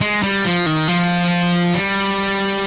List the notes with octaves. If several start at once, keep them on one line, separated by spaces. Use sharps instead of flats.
G#3
G3
F3
D#3
F3
G3